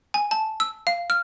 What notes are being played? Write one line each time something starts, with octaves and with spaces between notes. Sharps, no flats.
G#5
A5
E6
F5
F6